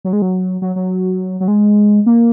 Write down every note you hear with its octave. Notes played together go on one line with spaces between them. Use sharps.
F#3
G#3
F#3
F#3
F#3
F#3
G#3
A#3